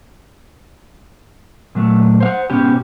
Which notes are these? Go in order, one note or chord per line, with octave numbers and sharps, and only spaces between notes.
A#2 F#3 A3
C5 F5 F#5
G#2 B2 B3 C#4 F#4 G4